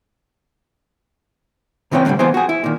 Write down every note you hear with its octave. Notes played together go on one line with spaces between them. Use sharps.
A#2 C#3 E3 C4 C#5 G5
C2 A2 D3 D#3 G3
E3 F#3 B3 E4 G#4 C5
F#4 G#4
E4
A#2 D#3